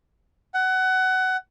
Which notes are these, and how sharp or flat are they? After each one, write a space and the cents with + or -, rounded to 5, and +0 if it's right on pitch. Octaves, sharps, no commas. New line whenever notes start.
F#5 +20